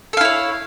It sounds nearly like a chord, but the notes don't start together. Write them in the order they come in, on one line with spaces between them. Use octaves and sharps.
A4 F5 E4 C#5